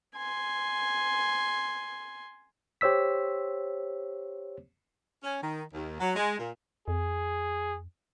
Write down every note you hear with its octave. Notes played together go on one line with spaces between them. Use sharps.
G#5 C6
G4 C5 C#5 E6 B6
C#4
D#3
D#2
F#3
G#3
A#2
F2 G#4